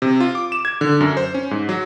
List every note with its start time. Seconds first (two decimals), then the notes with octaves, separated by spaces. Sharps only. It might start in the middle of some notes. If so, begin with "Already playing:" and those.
0.02 C3
0.20 F4
0.35 D6
0.52 E7
0.65 G#6
0.81 D3
1.01 F#2
1.17 C5
1.34 C#4
1.51 G#2
1.69 F#3